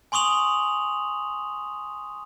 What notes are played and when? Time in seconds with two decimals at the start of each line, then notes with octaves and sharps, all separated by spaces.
0.12 G#5 C6 C#6 D#6 F7 F#7